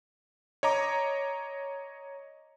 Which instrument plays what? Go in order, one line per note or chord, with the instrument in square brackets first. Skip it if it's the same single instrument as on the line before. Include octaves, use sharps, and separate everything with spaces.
[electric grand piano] C#5 D#5 A#5 D6